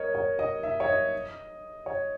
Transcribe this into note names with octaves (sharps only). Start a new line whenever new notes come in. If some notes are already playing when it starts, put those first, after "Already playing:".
Already playing: A#4 C#5 D#5
C#5
D#5
E5
C#5
D#5
C#5